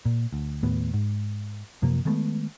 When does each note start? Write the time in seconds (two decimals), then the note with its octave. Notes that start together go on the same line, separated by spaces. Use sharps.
0.05 A#2
0.33 D2
0.63 D#2 A2 B3
0.94 G#2
1.82 F#2 C3 F3 A#3
2.05 D#3 G#3 A3 B3